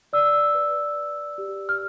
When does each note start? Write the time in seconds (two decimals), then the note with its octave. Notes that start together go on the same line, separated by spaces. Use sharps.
0.13 D5 E6
0.54 B4
0.96 D5
1.38 G4
1.69 F6